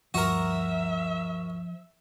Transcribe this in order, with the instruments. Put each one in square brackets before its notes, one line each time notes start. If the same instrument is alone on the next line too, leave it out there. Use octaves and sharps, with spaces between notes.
[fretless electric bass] D2 G2 [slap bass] F3 [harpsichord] F#4 A#4 [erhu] E5